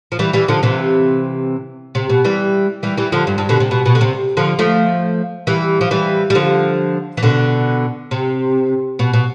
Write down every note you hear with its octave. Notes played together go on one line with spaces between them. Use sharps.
F3
E3 G3
E3 G3
D3 F3
C3 E3
C3
B2
E3 G3
E3 G3
E3 G3
D3 F3
G2
G2
B2 D3
C3
B2
B2
D3
C3
D3 F3
F3 A3
E3 G3
F3
E3 G3
G3
D3 F3
E3
B2 D3
C3
B2
B2